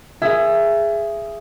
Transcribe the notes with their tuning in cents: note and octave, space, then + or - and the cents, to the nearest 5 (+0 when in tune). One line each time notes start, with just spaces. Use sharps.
G#4 +0 E5 +25